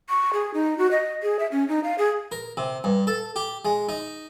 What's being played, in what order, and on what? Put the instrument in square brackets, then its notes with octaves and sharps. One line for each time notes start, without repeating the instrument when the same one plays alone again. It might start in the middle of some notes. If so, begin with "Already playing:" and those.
[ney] C#6
G#4
D#4
F#4
D#5
G#4
E5
C#4
D#4
F5
G#4
[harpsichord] A#4
C3
G2
A4
G4
G#3
D#4